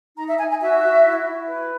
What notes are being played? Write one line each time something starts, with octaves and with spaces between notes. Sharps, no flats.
D#4 A#5
E5
D#4 G#5
G#5
F#4 E5
F#4
E4
E4
B4